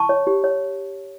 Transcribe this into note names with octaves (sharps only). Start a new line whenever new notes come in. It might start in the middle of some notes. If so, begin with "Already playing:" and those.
Already playing: A5 C#6
C#5
G4
C#5